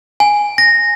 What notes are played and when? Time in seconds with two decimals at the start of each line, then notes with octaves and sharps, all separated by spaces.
0.20 G#5
0.58 A#6